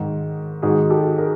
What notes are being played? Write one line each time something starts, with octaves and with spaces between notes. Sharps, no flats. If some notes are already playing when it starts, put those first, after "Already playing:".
Already playing: G#2 D#3
G#2 D#3 F#4 G#4
G4 A4
G#4 A#4